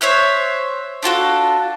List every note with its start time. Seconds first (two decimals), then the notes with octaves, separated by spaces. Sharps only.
0.01 C5 C#5 E5 F#6
1.03 D4 F4 F#4 A4